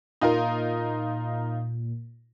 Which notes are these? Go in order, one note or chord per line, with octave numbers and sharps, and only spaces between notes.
A#2 D#4 F4 A#4